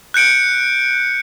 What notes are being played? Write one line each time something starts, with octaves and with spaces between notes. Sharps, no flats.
F#6 G6 C#7 D7